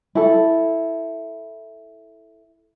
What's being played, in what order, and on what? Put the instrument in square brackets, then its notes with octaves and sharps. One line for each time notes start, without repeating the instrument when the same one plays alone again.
[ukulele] E4 A4